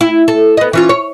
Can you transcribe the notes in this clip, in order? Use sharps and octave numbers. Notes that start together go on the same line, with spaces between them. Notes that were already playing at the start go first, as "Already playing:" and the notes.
E4
A4
B3 D#5
E3 C#4 F4
C#5